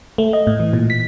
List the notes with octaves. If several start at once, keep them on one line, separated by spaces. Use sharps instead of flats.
A3
D#5
A2
E3
A#2
B6